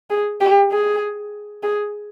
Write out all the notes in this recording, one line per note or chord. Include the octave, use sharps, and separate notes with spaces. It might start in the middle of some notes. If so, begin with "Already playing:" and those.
G#4
G4
G#4
G#4